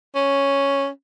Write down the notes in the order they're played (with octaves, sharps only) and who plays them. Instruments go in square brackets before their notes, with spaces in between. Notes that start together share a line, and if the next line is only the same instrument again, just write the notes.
[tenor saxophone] C#4